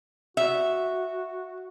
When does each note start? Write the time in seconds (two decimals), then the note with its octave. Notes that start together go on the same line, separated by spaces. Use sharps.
0.37 F#4 E5